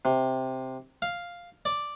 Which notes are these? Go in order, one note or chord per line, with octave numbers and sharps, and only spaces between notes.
C3
F5
D5